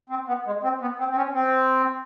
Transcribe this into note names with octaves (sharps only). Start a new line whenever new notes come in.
C4
B3
G#3
C4
B3
C4
C4
C#4
C4